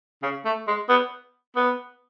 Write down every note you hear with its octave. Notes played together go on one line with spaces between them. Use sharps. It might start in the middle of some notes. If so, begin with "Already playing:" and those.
C#3
A3
G#3
B3
B3